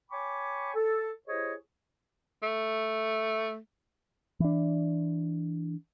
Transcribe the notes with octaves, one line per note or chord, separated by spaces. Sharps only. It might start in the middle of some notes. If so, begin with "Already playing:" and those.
C#5 G5 G#5 B5 C#6 D6
A4
E4 G4 G#4 C5 C#5 D#5
A3
E3 D4